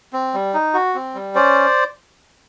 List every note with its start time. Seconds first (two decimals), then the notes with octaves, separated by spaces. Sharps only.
0.13 C4
0.34 G3
0.54 D#4
0.74 F#4
0.95 C4
1.14 G3
1.35 C#4 C5 D5